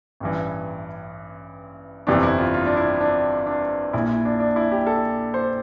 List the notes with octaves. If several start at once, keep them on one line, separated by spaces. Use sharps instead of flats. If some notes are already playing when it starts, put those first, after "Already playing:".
A1 G2 E3
G1 F2 C3 E3 D4
E4
F4
F4
D4
E4
D4
D4
A#1 A#2 E4
E4
D4
D4
E4
G4
A4
C5